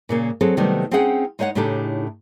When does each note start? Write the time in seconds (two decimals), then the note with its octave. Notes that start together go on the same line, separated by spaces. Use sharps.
0.09 A#2 C#3 A#3
0.41 F#3 C4 G#4 A4
0.57 C3 D#3 F#3 G3 A3 B3
0.91 C4 C#4 D#4 G#4 F#5 G5
1.39 G#3 D#4 C#5 D#5 F#5
1.55 A2 C#3 D4 D#4 G4 A4